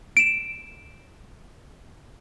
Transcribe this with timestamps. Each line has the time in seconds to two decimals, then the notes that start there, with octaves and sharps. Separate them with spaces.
0.17 D7 E7